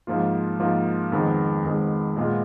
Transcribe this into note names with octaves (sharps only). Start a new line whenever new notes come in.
G#2 F3 A#3 F4
G#2 F3 A#3 F4
F2 D#3 G#3 B3
F2 D#3 G#3 B3
A#2 G#3 B3 F4